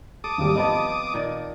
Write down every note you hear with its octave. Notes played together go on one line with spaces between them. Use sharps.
A4 D6 D#6
G#1 D#2 G3
F3 B3 C4 D#5 A5
A#2 D#3 D5